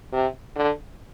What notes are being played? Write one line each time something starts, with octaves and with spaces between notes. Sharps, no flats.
C3
D3